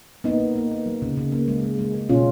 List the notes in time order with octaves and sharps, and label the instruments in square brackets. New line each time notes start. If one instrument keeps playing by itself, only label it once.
[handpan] A#3 B3 D#4
A#3
A#3
A#3
F#3
C#3
C#3
A#3
G#3
G#3
G#3
G#3
B2 C#4 F4